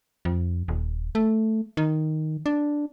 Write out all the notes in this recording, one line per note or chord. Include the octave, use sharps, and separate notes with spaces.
F2
D#1
A3
D#3
D4